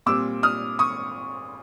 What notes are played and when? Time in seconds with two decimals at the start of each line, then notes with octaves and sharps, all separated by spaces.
0.06 A#2 G3 C4 D6 E6
0.43 D#6 F6
0.79 C#6 D#6